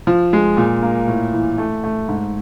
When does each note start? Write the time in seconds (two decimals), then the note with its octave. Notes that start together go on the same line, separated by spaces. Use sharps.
0.07 F3
0.33 G#3
0.57 A#2
0.83 A#3
1.08 A2
1.33 E3
1.58 A3
1.84 A3
2.09 G#2